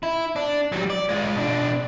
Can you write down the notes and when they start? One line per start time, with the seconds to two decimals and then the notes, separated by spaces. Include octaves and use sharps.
0.03 E4
0.36 D4
0.72 F#3 G3
0.90 D5
1.09 G#3 F4
1.36 B2 D4